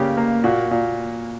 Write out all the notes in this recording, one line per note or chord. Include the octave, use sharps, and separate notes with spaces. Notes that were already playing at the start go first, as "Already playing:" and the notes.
Already playing: C#3 A#3 G4
A#3
A#2 F#4
A#2